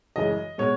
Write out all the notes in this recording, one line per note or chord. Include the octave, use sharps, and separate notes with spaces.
F#2 C#3 E3 G#3 D#5
B2 G#3 C#5